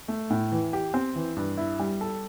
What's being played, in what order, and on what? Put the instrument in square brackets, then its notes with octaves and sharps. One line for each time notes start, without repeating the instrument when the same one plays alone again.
[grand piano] A3
A2
E3
G4
C4
E3
G2
E4
G3
A4